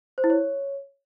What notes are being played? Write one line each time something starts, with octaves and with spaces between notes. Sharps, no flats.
C5
E4
C#5